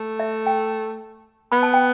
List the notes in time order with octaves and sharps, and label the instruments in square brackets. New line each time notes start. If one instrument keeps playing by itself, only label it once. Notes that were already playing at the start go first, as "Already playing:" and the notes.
Already playing: [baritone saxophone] A3
[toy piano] E5
G5
[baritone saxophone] B3 [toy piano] B5
[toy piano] A5
G5